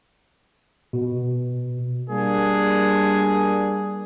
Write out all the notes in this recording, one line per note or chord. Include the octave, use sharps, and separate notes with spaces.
B2
G3 A#3 D4 G#4